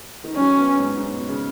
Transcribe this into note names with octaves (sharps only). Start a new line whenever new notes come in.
D#3
F#3 C#4
B3
G#2
G#2
B2
C#3